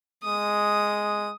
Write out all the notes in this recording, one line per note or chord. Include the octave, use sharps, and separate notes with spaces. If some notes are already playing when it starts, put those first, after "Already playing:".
G#3 D#6